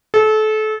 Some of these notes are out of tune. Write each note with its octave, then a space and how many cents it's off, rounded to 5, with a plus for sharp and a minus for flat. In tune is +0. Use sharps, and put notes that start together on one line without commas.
A4 -30